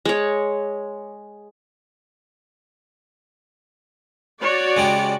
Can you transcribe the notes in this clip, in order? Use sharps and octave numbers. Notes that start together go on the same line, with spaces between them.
G#3 C#5
F#4 C#5 D5
C#3 G#3 G4